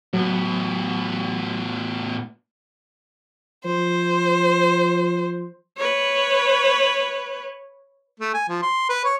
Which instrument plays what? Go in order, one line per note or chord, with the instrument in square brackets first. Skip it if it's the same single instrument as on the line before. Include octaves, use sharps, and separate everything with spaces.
[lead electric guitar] A2 B3 [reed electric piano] F#3
[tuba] F3 [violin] C5
[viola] B4 C#5
[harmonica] A3
G#5
F3
C6
B4
C#5